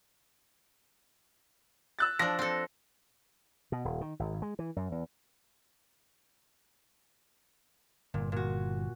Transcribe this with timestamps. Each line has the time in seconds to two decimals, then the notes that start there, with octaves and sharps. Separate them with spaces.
1.99 E6 F#6 A6
2.19 F3 D4 A#6
2.39 C4 A4
3.72 B2
3.85 D#1
4.01 D#3
4.19 G#1
4.42 G#3
4.59 E3
4.76 F#2
4.92 E2
8.14 G1 A#2
8.32 A#2 F#4